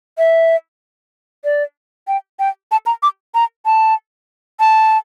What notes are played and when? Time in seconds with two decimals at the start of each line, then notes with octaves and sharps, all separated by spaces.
0.18 E5
1.44 D5
2.08 G5
2.39 G5
2.72 A5
2.86 A#5
3.03 D6
3.35 A#5
3.66 A5
4.60 A5